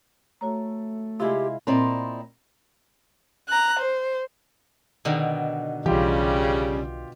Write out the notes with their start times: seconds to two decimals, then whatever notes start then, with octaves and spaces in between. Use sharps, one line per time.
0.41 A3 F#4 C#5 A#5
1.20 C3 G#3 E4 F4 G4
1.67 A#2 C4 E4 D5 D#5 A#5
3.49 A#5 F#6
3.79 C5
5.05 B2 D3 D#3
5.86 B1 C#3 E3 G3 F4 G4